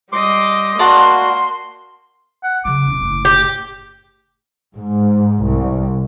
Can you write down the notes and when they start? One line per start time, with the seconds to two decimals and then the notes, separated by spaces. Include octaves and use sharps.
0.12 G3 D#5 C6 D6
0.79 A#3 F#4 D5 F#5 A5 C6
2.43 F#5
2.65 C#3 F#3 D6
2.86 E1 C#4
3.01 F#1 A2
3.25 G4
4.75 G#2
5.44 C2